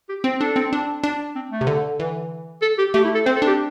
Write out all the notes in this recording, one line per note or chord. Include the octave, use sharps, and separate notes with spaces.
G4
C4 C5
D4 A4
C4
D4
D4
C4
A3
C3
D3
E3
A4
G4
A3 G4
E4
A4
C4 C5
A4
D4 G4